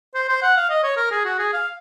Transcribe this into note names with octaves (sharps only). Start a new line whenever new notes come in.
C5
C5
F#5
F5
D#5
C#5
A#4
G#4
F#4
G#4
F5